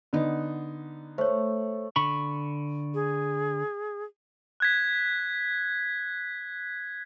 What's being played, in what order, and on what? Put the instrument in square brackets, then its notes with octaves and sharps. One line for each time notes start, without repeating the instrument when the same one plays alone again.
[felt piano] D3 B3 D#4
[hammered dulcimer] A3 [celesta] C5 C#5
[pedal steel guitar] D3 B5 C#6
[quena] G#4
[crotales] F#6 G#6 B6